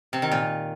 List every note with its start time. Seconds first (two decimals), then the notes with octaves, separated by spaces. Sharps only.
0.13 C3
0.22 D#3
0.32 A#2